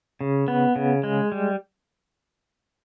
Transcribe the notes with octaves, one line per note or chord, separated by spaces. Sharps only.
C#3
B3
C#3
G#3
G3